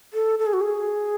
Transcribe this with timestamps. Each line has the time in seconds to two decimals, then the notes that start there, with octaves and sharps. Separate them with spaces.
0.14 A4
0.39 A4
0.46 G#4
0.53 F#4
0.61 G#4